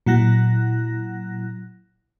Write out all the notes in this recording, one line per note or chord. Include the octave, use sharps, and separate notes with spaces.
A#2 F#3 E4 F#5 F#6 A#6